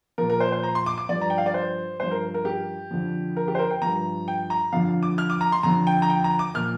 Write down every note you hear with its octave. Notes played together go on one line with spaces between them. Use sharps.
A#2 F3 A#4
A#4
C5
C5
A#5
C6
D6
D6
G2 F3 D5
A#5
G5
F5
D5
C5
G2 F3 C5
A#4
A#4
G4
F2 D3 F3
A#4
G4
C5
A#4
G5
G2 F3 A#5
G5
A#5
F2 D3 F3 F5
D6
F6
D6
A#5
C6
F2 D3 F3 A#5
G5
A#5
G5
A#5
D6
A#2 F3 F6